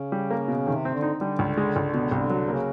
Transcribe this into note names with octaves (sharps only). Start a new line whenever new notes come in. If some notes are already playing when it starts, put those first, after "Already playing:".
Already playing: C#3
G3
A#3
B2
C3 D#3
C4
D3
D#4
D3
G3
C#2
G#3
C#2
B2
C#3
C2 D3
F#3
C#3 A#3